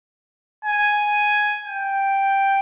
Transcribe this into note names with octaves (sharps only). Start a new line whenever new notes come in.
G#5
G5